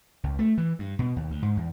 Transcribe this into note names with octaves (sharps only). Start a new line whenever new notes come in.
C#2
A3
E3
G2
B2
D#2
D2
G#2
E2